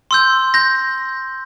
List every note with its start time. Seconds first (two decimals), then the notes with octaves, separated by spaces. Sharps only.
0.11 C6 E6 G6
0.54 G6 A#6